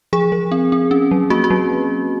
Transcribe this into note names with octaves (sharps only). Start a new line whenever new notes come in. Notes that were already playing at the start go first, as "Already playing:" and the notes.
F3 G#4
F3
C4
C4
C#4
F#3
A#3 F#4
F#4
F#3